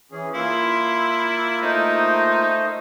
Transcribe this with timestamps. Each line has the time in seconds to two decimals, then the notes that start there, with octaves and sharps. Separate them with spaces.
0.12 E3 C#4 G#4
0.34 A#3 E4 F4 C6
1.62 A3 D#4 C5 D#5